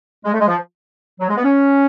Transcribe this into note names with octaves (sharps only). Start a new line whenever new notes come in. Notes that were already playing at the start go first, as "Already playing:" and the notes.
G#3
A3
G#3
F3
F#3
G#3
B3
C#4